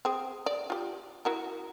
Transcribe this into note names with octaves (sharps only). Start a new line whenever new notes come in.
C4 G#4
D5
F4 G4
E4 F#4 A#4